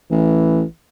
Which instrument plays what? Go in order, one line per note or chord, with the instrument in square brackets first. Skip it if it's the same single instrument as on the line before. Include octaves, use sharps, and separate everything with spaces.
[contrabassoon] A1 [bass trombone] E3